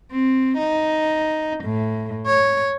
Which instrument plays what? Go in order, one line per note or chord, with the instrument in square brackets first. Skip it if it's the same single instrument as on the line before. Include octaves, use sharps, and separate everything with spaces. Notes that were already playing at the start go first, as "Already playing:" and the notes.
[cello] C4
D#4
A2
C#5